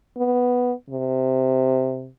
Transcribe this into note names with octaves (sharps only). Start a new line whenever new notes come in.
B3
C3